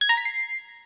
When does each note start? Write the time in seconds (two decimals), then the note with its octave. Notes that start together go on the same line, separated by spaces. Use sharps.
0.01 G#6
0.09 A#5
0.17 B6
0.25 C7